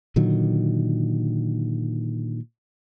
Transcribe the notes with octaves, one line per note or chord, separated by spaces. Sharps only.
A#2 D3 D#3 F#3